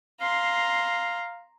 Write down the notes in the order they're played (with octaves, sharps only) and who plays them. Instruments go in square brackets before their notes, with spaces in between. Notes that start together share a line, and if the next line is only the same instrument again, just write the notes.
[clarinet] F5 [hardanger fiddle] A#5 C6